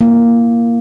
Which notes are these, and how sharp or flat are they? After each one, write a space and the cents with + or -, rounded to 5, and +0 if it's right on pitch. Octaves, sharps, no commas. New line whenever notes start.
A#3 +0 E4 +30